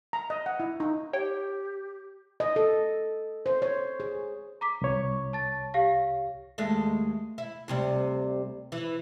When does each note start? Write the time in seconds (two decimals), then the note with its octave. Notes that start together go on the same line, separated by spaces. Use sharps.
0.13 A#5
0.30 D#5
0.46 F#5
0.60 E4
0.80 D#4
1.13 G4 C#5 G5
2.40 D#5
2.56 A4
3.46 C5
3.62 C#5
4.00 G#4
4.61 A#5 D6 B6
4.81 C2 C#5
5.33 A5 A6
5.74 G4 F5 A#6
6.58 D#2 G#3 A3
7.38 E4
7.68 D2 C3 G3
8.72 E3